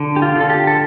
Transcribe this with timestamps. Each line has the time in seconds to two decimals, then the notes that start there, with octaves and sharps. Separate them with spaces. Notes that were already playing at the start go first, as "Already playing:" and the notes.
Already playing: D3
0.16 G4
0.22 F4
0.36 D3 A4
0.50 G4
0.67 A4